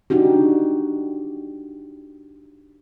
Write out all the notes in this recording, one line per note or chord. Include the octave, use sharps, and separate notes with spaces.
D4 D#4 F#4 G4